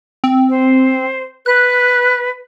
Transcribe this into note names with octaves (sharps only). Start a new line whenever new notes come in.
C4
C5
B4 F#6